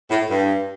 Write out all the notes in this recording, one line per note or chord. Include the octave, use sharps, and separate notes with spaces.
A2
G2